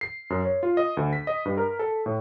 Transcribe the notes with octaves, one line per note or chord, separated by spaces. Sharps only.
C7
F#2
C#5
F4
D#5
D2
B6
D#5
G2
A#4
A4
A2